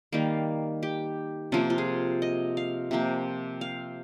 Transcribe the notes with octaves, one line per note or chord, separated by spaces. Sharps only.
D#3 G3 A#3 F5
G4
C3 F3 A#3 C#4
F4
G#4
D#5
F5
C3 F3 A#3
F5